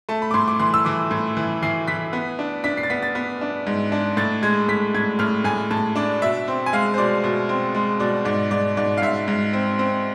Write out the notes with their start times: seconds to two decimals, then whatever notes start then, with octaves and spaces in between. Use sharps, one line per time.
0.09 A3 A5
0.22 B5
0.31 D6
0.34 A2 C6
0.48 D6
0.59 E3 C6
0.74 E6
0.85 E3 D6
1.11 A2
1.37 E3
1.63 E3 C7
1.88 E3 B6
2.13 B3
2.39 D4
2.64 D4 B6
2.77 C7
2.83 A6
2.90 B3 B6
3.03 A6
3.15 B3
3.41 D4
3.67 G#2
3.92 D4
4.17 A2 A6
4.43 G#3 G#6
4.68 A2 B6
4.95 A2 G#6
5.19 A2 F6
5.44 A2 G#5
5.71 A2 A5
5.96 D4 D5
6.22 B2 E5
6.48 C4
6.66 G#5
6.73 G#3 F5
6.94 C5
6.98 B2 D5
7.24 B2
7.49 C4
7.75 G#3
8.00 B2 D5
8.25 G#2 D5
8.51 G#2 D5
8.77 G#2 D5
8.97 F5
9.02 G#2 E5
9.28 G#2
9.53 C4
9.79 C4